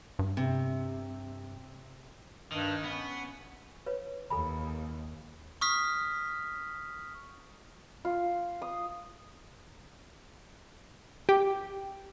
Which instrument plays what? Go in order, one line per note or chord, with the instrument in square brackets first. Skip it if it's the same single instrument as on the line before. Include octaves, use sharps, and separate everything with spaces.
[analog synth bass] G2
[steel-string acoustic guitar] C3
[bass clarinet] G2 [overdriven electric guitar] D#3
[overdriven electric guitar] B3 [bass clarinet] C#4
[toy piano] B4 C#5
[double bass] D#2 [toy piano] A4 G#5 B5
[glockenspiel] C#6 D#6 F6 B6
[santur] F4
D#6
[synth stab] G4